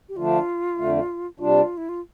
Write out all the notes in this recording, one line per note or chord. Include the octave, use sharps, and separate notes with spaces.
G4
D3 F3 A3 D4 F4
F2 D3 A3
C3 G3 D4 F4
E4
F4